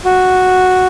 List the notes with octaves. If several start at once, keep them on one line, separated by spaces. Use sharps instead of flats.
F#4